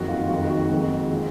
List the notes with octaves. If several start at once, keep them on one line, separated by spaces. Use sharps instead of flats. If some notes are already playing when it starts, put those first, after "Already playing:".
Already playing: F#1 F2 D#3 F#4
F4
F#1 F2 D#3 F#4
F#4
F2 D#3 G#3 F#4
F3 G#3